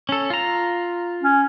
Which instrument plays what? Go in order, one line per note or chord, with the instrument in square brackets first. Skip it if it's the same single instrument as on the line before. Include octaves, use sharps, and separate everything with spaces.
[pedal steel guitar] C#4 A4
F4 A#5
[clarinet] C#4